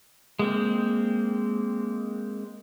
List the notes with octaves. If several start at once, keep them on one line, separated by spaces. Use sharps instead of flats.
G#3 A#3 C4